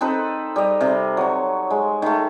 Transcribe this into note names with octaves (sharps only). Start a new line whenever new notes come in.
C4 D#4 A4 B4
G3 D#5
C3
F#3 C#5
G#3
D#3 A3